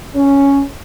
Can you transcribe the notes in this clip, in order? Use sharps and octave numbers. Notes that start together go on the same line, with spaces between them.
C#4